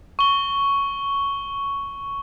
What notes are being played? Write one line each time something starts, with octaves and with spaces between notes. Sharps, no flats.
C#6 G7